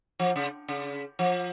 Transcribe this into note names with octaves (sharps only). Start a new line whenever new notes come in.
F3
C#3
C#3
F3